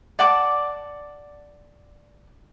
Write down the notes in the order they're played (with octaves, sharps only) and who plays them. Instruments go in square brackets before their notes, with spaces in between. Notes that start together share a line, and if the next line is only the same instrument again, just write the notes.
[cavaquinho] D5 F#5 A5 D6